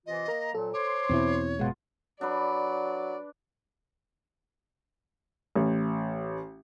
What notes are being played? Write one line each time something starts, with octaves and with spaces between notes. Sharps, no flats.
C3 E3 F4 D#5
A#3 A#4 A#5
F2 A#2 F#3 A4
C5 C#5 C6 D6
E2 B2 C4 E4
F#1 B2 G#3 F4 F#5
F#3 D4 B4 D5
A1